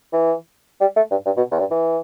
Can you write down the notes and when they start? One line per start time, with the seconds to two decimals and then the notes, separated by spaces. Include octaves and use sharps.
0.13 E3
0.81 G3
0.96 A3
1.11 G2
1.26 G2
1.37 B2
1.51 E2
1.59 G2
1.71 E3